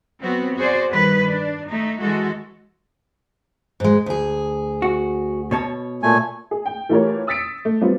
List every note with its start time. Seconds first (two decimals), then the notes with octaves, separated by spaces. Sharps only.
0.20 F#3 B3 C4 F#4
0.56 F#4 G#4 C5 D5
0.90 G2 D#3 G3 B4
1.25 D4
1.69 A3 D#4
2.00 E3 G#3 F#4 A4
3.80 G#2 G#3
4.06 D2 G#4
4.82 F#4
5.51 B2 C#5 A5
6.03 A#2 A3 G#5
6.51 G#4
6.66 G5
6.89 E3 A3 F4 G4 A#4 C#5
7.27 D#6 E6 A6 B6 C#7 D7
7.65 A3
7.81 F#3 G3 B3 C4 F4